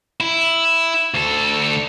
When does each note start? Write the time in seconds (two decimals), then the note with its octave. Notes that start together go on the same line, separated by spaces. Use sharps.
0.20 E4
1.14 D2 A4